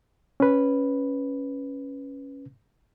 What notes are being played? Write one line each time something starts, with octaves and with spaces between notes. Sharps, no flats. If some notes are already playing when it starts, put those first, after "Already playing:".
C#4 B4